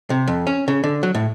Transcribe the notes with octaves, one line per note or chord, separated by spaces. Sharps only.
C3
F2
C#4
C#3
D3
F#3
A2